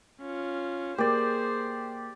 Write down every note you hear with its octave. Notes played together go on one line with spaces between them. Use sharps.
C#4 F4
A#3 G4 G#4 C5 D5